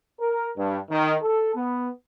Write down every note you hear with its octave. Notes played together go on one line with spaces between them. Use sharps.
A#4
G2
D#3
A4
B3